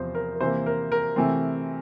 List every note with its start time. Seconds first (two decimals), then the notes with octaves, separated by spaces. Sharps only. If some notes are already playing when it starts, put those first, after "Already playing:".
Already playing: E2 C3 F3 C5
0.15 A#4
0.35 A#4
0.41 C3 E3 A#3 C5
0.66 A#4
0.92 A#4
1.16 C3 E3 A3 C4